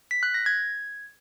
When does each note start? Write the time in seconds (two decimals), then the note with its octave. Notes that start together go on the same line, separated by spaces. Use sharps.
0.11 B6
0.23 F#6
0.34 A#6
0.46 G#6